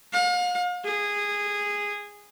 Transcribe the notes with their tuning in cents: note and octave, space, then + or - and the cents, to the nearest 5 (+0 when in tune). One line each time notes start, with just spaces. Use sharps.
F5 +40
G#4 -15